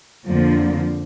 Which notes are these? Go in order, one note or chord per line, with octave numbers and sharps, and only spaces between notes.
F2 D3 F3 A#3